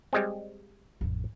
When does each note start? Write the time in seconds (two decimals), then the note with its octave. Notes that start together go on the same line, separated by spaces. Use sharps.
0.13 G3 G#3 C4
1.01 A1 F2